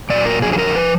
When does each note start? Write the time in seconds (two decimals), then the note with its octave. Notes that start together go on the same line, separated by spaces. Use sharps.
0.10 A#2 F#3 D5
0.26 A#4
0.42 F2 D3 F#3 G#4
0.53 G#4
0.59 A#4
0.75 F3 B4